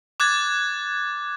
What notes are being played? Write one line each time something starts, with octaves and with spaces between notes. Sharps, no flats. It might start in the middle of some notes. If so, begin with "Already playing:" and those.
D6 F#6 G#6 A6